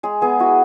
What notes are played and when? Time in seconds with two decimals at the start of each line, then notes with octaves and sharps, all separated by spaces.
0.03 G#3 G#4
0.21 B3 G#4
0.40 E4 F#4